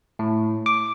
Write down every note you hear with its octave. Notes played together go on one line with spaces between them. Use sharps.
A2
D6